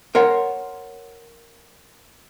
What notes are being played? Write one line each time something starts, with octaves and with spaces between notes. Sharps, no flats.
A#4 C5 C#5 F#5